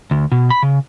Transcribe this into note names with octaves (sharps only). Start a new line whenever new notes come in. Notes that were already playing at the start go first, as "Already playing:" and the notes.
D2
B2
B5
C#3